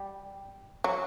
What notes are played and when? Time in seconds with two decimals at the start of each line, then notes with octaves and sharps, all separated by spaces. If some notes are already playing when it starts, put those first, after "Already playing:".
Already playing: G3
0.84 F#3